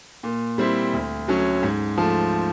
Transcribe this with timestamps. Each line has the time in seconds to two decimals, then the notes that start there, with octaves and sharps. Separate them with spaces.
0.23 A#2
0.58 G3 C4 E4
0.93 D2
1.28 D3 F#3 A3 C#4
1.63 G#2
1.98 F3 A3